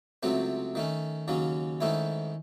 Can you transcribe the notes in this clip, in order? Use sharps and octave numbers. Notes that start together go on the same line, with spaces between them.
C#2 C3 F#3 A3 C4
D#3 A3 C#4
D#2 C#3 F#3 C#4
G#2 D#3 A3 C#4 E4